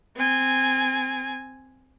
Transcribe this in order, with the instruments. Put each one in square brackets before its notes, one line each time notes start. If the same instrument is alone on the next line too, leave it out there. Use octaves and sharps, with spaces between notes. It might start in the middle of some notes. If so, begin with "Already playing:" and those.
[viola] C4 G#5